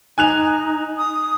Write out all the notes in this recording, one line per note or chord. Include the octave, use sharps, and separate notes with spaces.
D#4 G#5 F#6 F7
D#6